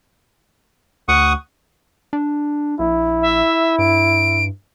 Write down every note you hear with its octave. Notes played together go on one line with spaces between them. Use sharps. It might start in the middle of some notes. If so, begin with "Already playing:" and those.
D2 F#5 C#6 D#6
D4
A#1 E4
E5
G2 D7